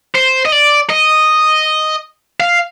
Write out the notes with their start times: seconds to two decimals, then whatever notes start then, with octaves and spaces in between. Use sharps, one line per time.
0.15 C5
0.45 D#5
0.52 D5
0.90 D#5
2.40 F5